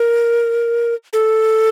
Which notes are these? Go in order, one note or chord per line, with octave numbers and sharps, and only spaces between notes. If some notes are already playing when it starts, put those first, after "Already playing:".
Already playing: A#4
A4